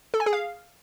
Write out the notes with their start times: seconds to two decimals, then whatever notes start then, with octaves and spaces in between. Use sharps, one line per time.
0.14 A4
0.20 G#5
0.26 G#4
0.33 F5